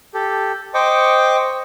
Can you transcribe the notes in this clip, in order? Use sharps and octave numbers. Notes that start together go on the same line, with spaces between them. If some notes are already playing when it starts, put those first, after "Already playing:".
G4 A4
C5 D#5 G5 C#6 D6